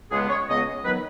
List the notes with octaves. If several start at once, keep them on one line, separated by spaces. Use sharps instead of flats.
C#2 C#3 G#3 B3 G#4
C#5
C#2 C#3 G#3 B3 D#5
D#3 F#3 B3 B4